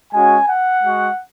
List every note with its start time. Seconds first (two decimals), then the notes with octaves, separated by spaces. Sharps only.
0.13 G#3 C#4 F#4 G#5
0.49 F#5
0.84 G#3 F#4